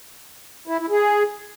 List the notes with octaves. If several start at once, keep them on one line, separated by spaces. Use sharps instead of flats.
E4
E4
G#4